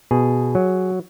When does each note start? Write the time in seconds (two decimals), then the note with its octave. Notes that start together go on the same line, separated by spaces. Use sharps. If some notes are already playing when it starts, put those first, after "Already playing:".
0.11 B2 G#4
0.55 F#3